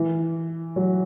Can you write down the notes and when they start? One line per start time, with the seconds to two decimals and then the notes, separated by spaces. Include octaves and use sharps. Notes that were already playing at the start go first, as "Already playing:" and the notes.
Already playing: E3
0.76 F#3